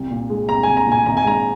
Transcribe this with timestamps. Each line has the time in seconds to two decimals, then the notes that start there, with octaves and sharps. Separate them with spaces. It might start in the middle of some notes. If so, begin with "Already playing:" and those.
Already playing: C2
0.11 A#2
0.30 G#3
0.49 C2 A#5
0.63 C2 G#5
0.77 A#5
0.87 A#2 G#5
1.06 G#1 A#5
1.17 G#5
1.25 G#2 A#5